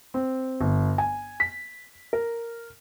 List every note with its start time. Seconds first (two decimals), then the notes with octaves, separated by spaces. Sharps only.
0.14 C4
0.61 G1
0.98 G#5
1.40 B6
2.13 A#4